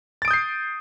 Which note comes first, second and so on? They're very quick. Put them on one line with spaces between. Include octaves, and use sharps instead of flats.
A6 D7 D#6 G6 C7